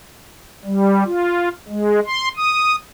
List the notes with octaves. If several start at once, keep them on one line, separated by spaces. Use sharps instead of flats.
G3
F4
G#3
C6
D#6